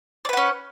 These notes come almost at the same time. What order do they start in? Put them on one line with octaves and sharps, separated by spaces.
D5 B4 F#5 C#4